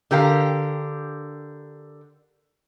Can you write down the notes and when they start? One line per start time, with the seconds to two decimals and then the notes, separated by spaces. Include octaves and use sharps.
0.11 D3 G4 A#4 F5